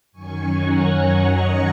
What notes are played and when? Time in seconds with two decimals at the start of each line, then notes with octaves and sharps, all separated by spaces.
0.12 F#2 D#3 F#3 C#4 G#5 C#6
0.55 F#5 A#5
0.97 F#5 A#5
1.25 D#5 G#5